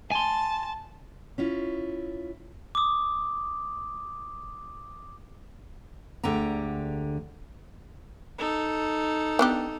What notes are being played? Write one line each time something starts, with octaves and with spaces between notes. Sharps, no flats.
G#5 A5 C6
C#4 E4 F4
D6 D#6
D2 D3 G#3 G4 A#5
D#4 A4
B3 D4 G4